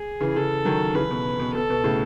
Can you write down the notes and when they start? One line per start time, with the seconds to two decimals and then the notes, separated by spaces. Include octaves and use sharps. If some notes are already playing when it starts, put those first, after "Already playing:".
Already playing: G#4
0.21 C#3 E3
0.36 C#3 E3 A4
0.65 D#3 F#3
0.95 C#3 E3 B4
1.11 B2
1.39 B2
1.54 B2 A4
1.70 B2
1.84 A2 C#3